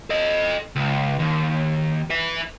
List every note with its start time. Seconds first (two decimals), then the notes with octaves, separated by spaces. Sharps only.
0.10 A4 D#5
0.75 C#2
1.19 D#2
2.10 B4 E5